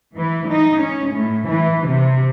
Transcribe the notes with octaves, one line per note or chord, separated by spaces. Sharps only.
E3
D#4
C#4
A2
E3
C3